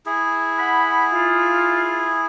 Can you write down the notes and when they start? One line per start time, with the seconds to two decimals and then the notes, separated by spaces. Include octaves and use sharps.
0.06 E4 G#4
0.58 F#5 B5
1.12 F4